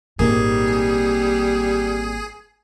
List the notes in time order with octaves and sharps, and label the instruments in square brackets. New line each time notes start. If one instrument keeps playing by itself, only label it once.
[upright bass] G#1 A#2 [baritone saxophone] G3 [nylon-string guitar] A#3 C4 D#4 [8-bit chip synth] G#4